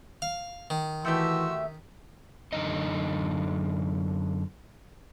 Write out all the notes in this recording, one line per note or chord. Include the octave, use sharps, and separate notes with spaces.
F5
D#3
E3 A3 F#4 G4 E5 C6 E6
F#2 D3 D#4 D#5